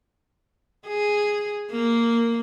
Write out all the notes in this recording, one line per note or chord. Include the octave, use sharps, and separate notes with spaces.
G#4
A#3